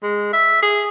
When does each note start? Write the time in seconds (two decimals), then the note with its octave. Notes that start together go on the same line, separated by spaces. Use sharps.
0.03 G#3
0.33 E5
0.63 G#4